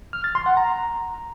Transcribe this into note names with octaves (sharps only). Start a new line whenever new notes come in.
F6
A6
C6
F#5
A#5